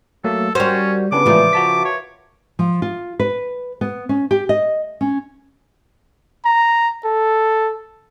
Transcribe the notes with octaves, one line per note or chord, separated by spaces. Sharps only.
F#3 A3 A#3 A4
G3 C#4 F#4 A#4 C5
C#3 G3 B3 C#4 D4 B4 D6
A2 C#3 E3 F3 G#3 F4 A#4 E5
F#4 A5 B6
C#5
F3
F4
B4
B3
C#4
G4
D#5
C#4
A#5
A4